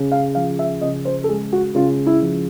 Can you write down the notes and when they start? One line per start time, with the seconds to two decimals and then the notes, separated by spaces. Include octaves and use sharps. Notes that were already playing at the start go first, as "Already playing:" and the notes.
Already playing: C#3
0.12 F5
0.35 F3 F5
0.59 E5
0.81 C#3 D#5
1.05 C5
1.24 A4
1.28 G#3 G#4
1.53 F#4
1.75 C#3 F4
2.07 E4
2.22 F3